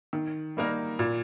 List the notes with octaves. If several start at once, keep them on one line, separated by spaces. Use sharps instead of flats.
D#3
G3 A#3 D#4 A#4
A#2